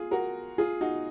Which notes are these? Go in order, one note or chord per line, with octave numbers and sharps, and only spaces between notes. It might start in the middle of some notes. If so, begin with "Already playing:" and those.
Already playing: F4 G#4
F#4 A#4
F4 G#4
D#4 F#4